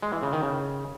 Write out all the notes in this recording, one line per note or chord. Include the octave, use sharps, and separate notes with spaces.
G#3
E3
C#3
D#3
C#3